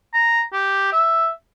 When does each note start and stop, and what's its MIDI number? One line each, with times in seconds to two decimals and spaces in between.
0.14 0.41 82
0.53 0.89 67
0.93 1.29 76